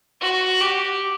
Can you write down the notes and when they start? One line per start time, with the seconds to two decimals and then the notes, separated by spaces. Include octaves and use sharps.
0.21 F#4
0.60 G4